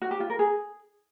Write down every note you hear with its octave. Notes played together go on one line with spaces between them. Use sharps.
F#4
G4
F4
A#4
G#4